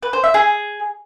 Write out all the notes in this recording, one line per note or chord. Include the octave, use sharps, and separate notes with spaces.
B4
C5
E5
G#4